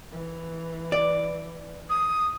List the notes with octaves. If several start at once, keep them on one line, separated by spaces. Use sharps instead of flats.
E3
D5
D#6